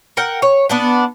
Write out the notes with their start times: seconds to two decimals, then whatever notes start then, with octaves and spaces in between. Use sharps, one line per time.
0.17 A#4 F#5 G5
0.42 C#5
0.70 B3 D4 F#5